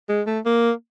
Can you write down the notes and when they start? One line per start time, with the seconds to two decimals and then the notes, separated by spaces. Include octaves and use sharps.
0.09 G#3
0.27 A3
0.46 A#3